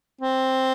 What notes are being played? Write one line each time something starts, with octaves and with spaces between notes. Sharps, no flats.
C4